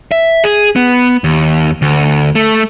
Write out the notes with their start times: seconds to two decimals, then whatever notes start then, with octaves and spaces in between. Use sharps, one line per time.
0.12 E5
0.44 G#4
0.76 B3
1.24 D#2
1.82 D2
2.35 A3